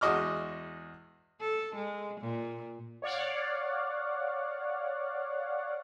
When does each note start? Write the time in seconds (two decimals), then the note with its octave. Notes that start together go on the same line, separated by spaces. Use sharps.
0.01 E2 G#3 F#4 D#5 D6 F6
1.40 A4
1.75 G#3
2.20 A#2
3.02 C#5 D5 F5 F#5